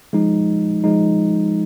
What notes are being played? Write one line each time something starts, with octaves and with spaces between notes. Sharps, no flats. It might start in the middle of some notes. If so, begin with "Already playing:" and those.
F3 G#3 D#4
F3 G#3 D#4